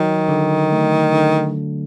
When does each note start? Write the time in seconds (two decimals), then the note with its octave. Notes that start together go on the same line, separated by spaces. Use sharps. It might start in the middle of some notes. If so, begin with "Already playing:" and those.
Already playing: D#3 F#3
0.29 D3
0.72 A3
1.13 D3